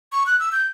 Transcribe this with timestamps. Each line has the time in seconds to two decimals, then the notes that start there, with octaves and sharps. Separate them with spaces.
0.12 C#6
0.26 F#6
0.39 E6
0.52 G6